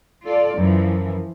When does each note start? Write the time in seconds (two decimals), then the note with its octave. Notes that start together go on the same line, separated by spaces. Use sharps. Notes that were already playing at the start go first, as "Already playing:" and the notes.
0.24 F4 A4 D5
0.58 F#2 E3 F3